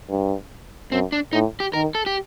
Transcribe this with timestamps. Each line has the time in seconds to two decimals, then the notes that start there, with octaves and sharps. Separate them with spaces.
0.10 G2
0.92 F#2 C4
1.12 D4
1.33 A2 D#4
1.60 G4
1.73 D#3 A#4
1.95 A4
2.06 G4